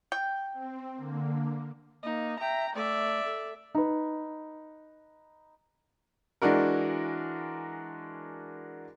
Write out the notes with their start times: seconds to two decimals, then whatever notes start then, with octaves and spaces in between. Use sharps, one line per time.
0.12 G5
0.53 C4
0.95 D3 A#3
2.03 A#3 D#4
2.40 E5 G5 A#5
2.75 A3 D5 E5
3.24 A4
3.75 D#4 B4
6.42 E3 G#3 D4 F#4 A#4